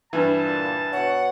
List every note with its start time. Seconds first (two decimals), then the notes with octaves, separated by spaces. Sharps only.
0.13 G2 E3 A5
0.43 A#2
0.93 B2 C#5 F#5